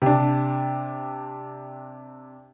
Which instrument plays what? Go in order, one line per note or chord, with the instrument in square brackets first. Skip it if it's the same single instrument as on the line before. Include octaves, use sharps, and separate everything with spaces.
[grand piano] C3 D4